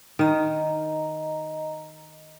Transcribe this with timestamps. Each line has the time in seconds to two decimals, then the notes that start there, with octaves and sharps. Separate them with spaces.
0.19 D#3 D#5 A#5